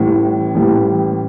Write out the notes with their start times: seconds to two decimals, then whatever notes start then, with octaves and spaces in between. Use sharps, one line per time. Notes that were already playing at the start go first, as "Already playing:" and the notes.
Already playing: A1 A2 G3
0.55 A1 A2 G3